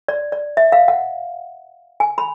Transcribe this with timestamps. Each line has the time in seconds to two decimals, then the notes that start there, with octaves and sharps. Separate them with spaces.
0.08 D5
0.32 D5
0.57 E5
0.72 F5
0.88 F#5
2.00 G#5
2.18 B5